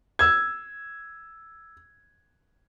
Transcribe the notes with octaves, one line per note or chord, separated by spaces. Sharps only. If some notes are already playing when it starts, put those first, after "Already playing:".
E6 G#6